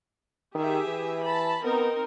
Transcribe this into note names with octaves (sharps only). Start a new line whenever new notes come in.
D#3 G4 G#4 E5
E3
A5 B5
B3 C4 D#4 A#4